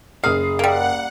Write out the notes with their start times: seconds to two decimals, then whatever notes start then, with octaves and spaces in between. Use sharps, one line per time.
0.24 F#1 G#4 F5 D#6 C7
0.59 G3 A#3 F#5